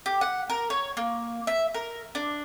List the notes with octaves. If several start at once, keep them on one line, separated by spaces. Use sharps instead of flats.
G4
F#5
A#4
C#5
A#3
E5
A#4
D4